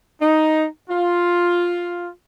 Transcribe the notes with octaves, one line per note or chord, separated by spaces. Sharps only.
D#4
F4